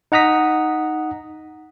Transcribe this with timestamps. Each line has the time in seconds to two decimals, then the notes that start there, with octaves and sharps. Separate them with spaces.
0.12 D#4 F#5 A#5 D#6 B6